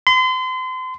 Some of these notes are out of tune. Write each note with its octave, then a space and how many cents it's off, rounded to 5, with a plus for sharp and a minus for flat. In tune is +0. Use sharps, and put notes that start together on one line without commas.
C6 -35